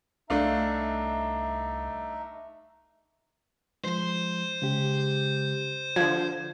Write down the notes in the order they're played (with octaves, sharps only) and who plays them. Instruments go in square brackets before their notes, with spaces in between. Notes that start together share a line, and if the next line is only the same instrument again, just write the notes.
[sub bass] C2 [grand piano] A3 D4 F5 [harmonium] D#4 E5 A#5
[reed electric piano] F3 G#3 [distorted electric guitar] C5
[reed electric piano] C#3 G#3 G4
[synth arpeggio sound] D3 F3 [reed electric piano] G#6